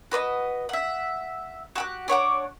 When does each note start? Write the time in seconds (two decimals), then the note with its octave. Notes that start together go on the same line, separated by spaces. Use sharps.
0.11 F#4 B4 D5 D#5
0.69 E5 F#5
1.76 F#4 G4 F#6
2.08 D4 C#5 F#5 D6